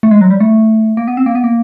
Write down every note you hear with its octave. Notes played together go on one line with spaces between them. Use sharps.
A3
G#3
F#3
G3
A3
A#3
B3
C4
A#3
B3
A#3